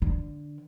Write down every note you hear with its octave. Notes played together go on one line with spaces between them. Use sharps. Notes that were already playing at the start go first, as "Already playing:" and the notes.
D3